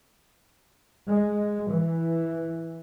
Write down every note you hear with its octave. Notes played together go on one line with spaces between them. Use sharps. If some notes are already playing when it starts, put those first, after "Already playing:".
G#3
E3